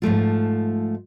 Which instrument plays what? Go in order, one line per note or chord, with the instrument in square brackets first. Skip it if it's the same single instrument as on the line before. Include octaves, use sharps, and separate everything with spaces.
[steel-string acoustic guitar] G#2 F3 A3 F4